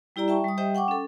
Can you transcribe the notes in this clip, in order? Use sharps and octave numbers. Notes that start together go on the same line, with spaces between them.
G3 E4 G4 D5 A#5
E5 G5 A5 C#6
G3 D#6
G3 G4 C5 D#5 E5 G5
F#5 G5 C#6 D6
C#4 A4